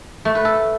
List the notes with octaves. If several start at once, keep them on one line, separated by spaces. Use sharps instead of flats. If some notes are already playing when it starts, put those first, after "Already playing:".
A3
B4
A4